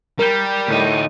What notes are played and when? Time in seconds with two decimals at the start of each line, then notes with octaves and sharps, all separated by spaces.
0.19 G3 A#4 G6
0.68 D2 A2 D#4